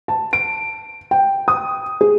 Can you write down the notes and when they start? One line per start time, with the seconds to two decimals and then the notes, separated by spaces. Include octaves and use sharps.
0.08 A5
0.33 D7
1.11 G5
1.48 D#6
2.01 G#4